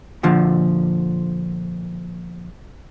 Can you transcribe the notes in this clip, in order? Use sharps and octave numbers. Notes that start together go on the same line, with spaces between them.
A#2 D3 F3